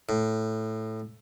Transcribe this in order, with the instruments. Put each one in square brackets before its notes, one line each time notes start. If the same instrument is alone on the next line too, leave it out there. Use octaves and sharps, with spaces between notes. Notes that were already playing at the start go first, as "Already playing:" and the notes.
[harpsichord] A2